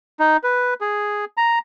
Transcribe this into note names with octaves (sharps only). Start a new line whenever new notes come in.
D#4
B4
G#4
A#5